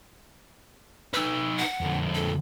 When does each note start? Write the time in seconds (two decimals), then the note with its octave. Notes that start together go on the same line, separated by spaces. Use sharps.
1.14 D#4 B4 E6
1.58 F#5
1.81 F2 D3
2.15 A4